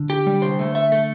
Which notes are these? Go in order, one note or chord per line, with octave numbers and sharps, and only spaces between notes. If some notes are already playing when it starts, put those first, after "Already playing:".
Already playing: D3
G4
G3
C5
A3
E5
A3